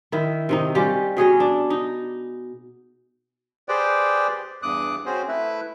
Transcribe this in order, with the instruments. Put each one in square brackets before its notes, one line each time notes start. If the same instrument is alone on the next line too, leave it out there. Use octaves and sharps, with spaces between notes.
[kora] D#3 E4
C3 D#3 D#4
G3 C#4 F4 G4
B2 G#4 C#5 D#5
D4
D#4
[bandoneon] G4 G#4 B4 C5 D5 G5
E2 G2 D6 D#6 F#6
C4 C#4 F#4 G#4 C5
A3 E4 B4 E5